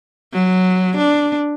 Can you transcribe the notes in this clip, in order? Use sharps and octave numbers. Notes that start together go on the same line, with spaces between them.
F#3
D4